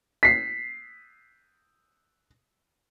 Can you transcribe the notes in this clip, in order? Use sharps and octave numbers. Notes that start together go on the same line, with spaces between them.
B6 C7